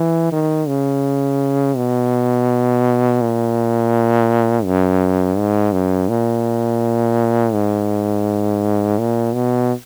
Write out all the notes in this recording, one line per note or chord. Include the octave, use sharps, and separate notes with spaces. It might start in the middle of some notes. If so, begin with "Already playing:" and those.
Already playing: E3
D#3
C#3
B2
A#2
F#2
G#2
F#2
A#2
G#2
A#2
B2